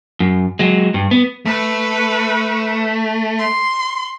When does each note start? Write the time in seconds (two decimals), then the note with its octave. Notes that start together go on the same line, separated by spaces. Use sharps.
0.20 F#2
0.59 F#3 G#3
0.94 G2
1.11 B3
1.46 A3 B4
3.39 C6